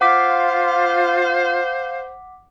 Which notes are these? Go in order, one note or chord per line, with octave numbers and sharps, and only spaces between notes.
F4 C5 F5 F#5 D6 B6